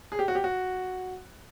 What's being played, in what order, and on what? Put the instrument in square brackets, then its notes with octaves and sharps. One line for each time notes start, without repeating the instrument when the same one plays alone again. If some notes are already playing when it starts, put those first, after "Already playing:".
[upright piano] G#4
G4
F#4
G4
F#4